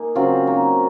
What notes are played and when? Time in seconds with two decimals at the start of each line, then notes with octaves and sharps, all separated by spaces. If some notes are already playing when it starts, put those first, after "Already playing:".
Already playing: A#3 D#4 G#4
0.15 C#3 F#3 C4 F4
0.47 F#3 A#3 D#4